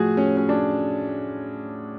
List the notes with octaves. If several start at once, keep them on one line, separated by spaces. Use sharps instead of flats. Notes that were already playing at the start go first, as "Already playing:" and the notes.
Already playing: A2 F3 F#4 G#4
C#4
C#4
D4